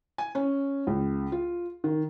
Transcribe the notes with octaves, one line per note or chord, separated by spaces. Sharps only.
G#5
C#4
C#2
F4
D#3